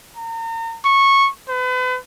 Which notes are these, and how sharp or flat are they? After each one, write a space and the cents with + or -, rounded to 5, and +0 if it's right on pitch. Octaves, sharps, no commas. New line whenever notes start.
A#5 -35
C#6 -15
B4 +40